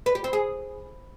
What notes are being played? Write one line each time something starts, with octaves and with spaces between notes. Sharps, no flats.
B4
G4
C4
G#4